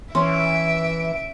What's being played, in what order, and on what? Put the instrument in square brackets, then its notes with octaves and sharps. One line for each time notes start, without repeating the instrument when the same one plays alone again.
[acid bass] E3 [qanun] C#4 [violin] E5 D7 [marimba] C6